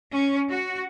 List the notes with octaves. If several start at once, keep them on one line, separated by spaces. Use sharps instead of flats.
C#4
F#4